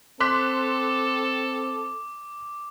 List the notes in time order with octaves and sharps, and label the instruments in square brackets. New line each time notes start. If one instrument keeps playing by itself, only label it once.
[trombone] C4 [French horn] A4 [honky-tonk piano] C6 F#6 B6 [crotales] D6